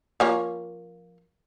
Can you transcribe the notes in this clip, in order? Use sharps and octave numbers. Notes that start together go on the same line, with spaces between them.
F3 A#3 C#4